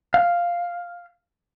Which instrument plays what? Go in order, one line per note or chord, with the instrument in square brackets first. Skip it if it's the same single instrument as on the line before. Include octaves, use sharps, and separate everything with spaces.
[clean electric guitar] F5